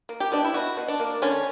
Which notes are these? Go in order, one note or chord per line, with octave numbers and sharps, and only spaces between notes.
A#3
G4
B2 D4
E4
B2 F#4
B2
D4
A#3
D3 C#4